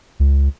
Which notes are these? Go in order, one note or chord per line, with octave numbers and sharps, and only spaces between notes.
C#2